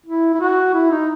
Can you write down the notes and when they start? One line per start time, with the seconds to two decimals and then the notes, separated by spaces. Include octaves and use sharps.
0.06 E4
0.34 E4
0.40 F#4
0.74 E4
0.91 D#4